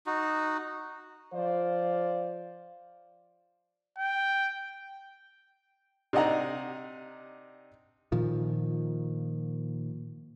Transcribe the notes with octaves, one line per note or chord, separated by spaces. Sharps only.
D#4 F#4
F3 C5 D5 F5
G5
C3 D4 D#4 D#5 F#5 A#5
A#2 D#3 F3